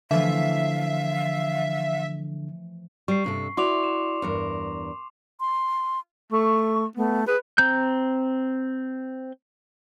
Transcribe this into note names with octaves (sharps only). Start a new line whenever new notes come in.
D3 E3 F3 A3 E5 F5
G3 C#6 C7
G2 C3 A4
E4 F#4 D5 C6 D6 F7
E7
E2 G2 A#4
C6
A3 C#6
A3 B3
G#4 B4
C4 A#5 G6